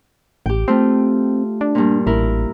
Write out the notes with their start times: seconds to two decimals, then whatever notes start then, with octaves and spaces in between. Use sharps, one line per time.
0.46 A1 G4 G5
0.68 A3 C4 F4
1.61 D4
1.75 G2 A#2
2.07 A1 E4 A#4